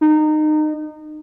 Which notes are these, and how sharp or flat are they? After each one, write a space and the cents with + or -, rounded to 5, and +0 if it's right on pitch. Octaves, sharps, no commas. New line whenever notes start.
D#4 -25